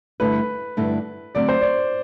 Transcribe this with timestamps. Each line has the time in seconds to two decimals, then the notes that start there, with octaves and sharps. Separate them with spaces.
0.20 G2 D3 A3 E4 B4
0.77 G2 D3 A3 E4
1.35 D3 F#3 A3 C4 D5
1.49 C5
1.61 D5